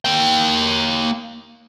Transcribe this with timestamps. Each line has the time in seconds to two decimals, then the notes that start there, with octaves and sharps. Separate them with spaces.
0.05 A#3 G5